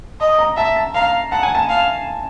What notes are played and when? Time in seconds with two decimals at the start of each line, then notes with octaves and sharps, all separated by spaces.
0.20 D#5
0.39 A#5
0.57 E5 A5
0.76 A5
0.94 F5 A#5
1.32 F#5 A5
1.43 G#5
1.55 A5
1.69 F5